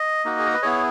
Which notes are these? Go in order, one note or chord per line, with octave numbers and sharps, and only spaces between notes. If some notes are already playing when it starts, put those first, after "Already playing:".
Already playing: D#5
A#3 D#4 F#4
G#4
A#4
B4
B3 E4 G#4 C#5